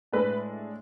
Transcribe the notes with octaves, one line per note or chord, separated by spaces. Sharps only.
A2 G#3 D4 B4